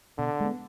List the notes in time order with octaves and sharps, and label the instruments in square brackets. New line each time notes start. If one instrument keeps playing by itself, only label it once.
[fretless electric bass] B2 [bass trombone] D3
[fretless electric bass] G#3 B3